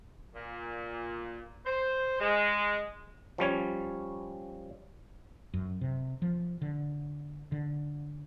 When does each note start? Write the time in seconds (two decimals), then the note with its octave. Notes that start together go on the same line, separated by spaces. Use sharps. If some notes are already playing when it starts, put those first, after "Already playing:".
0.34 A#2
1.66 C5
2.20 G#3
3.38 F3 G3 C#4 C#5
5.54 F#2
5.81 C3
6.22 F3
6.62 D3
7.52 D3